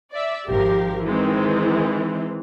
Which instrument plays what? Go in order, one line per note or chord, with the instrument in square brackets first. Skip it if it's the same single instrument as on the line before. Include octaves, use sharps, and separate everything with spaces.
[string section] D5 E5
[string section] G#1 F3 A#4 [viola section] G4
[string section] D#3 G#3 C4 [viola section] E3